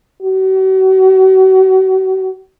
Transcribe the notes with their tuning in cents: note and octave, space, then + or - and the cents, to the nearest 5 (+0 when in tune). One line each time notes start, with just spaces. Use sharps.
F#4 +40